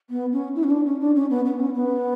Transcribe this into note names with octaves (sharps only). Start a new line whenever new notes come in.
B3
C#4
E4
C#4
D4
C#4
D4
C#4
B3
B3
C#4
B3